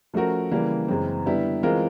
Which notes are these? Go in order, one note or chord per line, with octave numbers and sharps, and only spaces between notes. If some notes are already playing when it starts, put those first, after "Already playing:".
F3 A3 C#4 F#4 A#4
C#3 E3 G3 A#3
F#2 C#3 E3 G#3 C4
D3 G3 B3 E4
E3 G#3 C4 F4 A#4